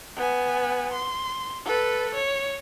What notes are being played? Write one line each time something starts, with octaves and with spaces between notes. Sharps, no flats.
B3 G#5
C6
A4 B4
C#5